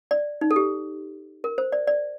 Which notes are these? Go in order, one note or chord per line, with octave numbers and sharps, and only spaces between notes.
D5
D#4
A4
G4
A#4
C5
D5
D5